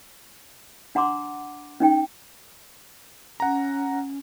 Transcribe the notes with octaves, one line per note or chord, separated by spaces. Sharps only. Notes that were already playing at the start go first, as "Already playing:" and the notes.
D4 F#5 A#5 C6 D6
C#4 D#4 G5
C#4 F#5 A#5